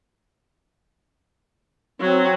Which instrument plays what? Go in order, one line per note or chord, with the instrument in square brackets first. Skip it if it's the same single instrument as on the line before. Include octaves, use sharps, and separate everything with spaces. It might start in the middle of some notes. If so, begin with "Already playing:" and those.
[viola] F#3 [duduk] C4